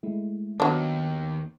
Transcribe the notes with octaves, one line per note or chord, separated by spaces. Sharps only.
G#3 A3 E4
D#2 F#3 B3 D4